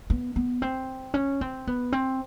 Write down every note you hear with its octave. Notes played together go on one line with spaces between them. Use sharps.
B3
B3
C4
C#4
C4
B3
C4